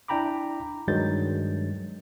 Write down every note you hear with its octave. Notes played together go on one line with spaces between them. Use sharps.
D4 E4 G5 A#5 B5 D6
G2 D#3 F#3 G#3 G6 A6